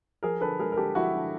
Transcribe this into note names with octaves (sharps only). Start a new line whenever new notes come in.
F3 G#4 A#4
D3 A4 B4
G#3 G#4 A#4
A#4
D3 G4 A4
F3 E4 F#4
D3